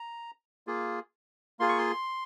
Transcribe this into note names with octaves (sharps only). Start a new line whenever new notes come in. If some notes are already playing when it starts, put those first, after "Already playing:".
Already playing: A#5
A#3 F4 G#4
A#3 F4 G#4 C6
C#6
C6